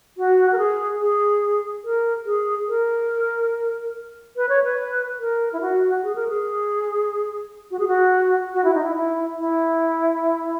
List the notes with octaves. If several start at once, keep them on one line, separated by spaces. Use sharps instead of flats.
F#4
A#4
G#4
G#4
A#4
G#4
A#4
B4
C#5
B4
A#4
E4
F#4
G#4
A#4
G#4
F#4
G#4
F#4
F#4
E4
D#4
E4
E4
E4